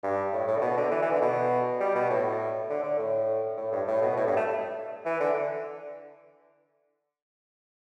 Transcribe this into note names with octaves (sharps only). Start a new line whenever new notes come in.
G2
A2
A2
D3
B2
D3
E3
E3
D3
B2
G3
B2
A2
D3
D3
A2
A2
G2
A2
B2
A2
G2
A3
E3
D3